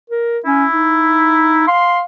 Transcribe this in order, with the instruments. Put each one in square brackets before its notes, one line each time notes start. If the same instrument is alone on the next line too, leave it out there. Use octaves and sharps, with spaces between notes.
[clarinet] A#4
[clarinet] C#4 [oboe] E4
[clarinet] D#4
[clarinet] F5 [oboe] C6